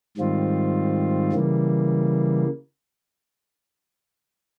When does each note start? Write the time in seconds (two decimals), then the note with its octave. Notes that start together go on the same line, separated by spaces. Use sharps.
0.17 G#2 D#3 G3 C4 F4
1.33 C#3 E3 G3 A#3